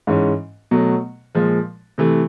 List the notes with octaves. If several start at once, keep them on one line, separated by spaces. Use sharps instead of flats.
G#2 E3 G#3 C#4
B2 F#3 A3
A#2 F3 G#3
C3 E3 A3